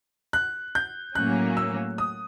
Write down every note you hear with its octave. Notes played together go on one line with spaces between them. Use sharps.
F#6
G6
A2 F#3 A#3 C#4 F#6
E6
D#6